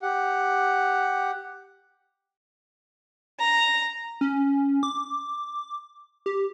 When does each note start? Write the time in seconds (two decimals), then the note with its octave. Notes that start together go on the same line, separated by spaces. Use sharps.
0.02 G4 F#5
3.39 A#5
4.21 C#4
4.83 D6
6.26 G4